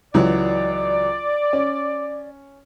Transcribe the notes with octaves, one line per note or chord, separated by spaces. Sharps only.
C#2 E3 F#3 D5
C#4